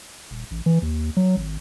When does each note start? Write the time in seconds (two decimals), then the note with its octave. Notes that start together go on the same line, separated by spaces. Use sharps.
0.31 D#1
0.51 A1
0.66 E3
0.82 D#2
1.17 F#3
1.37 G#1